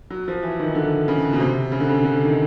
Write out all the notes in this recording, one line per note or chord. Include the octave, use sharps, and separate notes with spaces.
F#3
F3
E3
D#3
D3
C#3
B2
C3
C#3
D3
C#3
D3
D#3